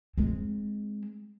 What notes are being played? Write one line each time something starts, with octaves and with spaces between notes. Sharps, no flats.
G#3 C4